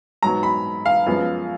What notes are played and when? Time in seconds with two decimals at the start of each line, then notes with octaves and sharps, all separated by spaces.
0.23 G#2 F#3 B3 A#5
0.43 B5
0.86 F5
1.06 F#2 F3 G#3 B3